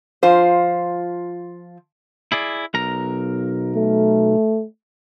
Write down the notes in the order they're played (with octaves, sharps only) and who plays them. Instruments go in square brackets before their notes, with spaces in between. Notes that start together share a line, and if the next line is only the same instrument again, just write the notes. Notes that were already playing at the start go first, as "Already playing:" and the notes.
[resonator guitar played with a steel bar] F3 F4 C5
[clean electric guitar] E4 G#4 D5
B1 A#4 A#5
[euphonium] A3